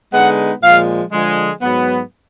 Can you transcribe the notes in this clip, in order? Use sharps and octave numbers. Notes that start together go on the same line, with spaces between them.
D3 G#3 B3 D#4 F#5
A#2 F3 G#3 F5
D3 F3 G#3
G#2 F#3 B3